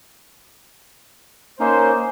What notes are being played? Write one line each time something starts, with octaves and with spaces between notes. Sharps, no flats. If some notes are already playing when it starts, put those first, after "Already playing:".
A#3 C#4 D#4 C5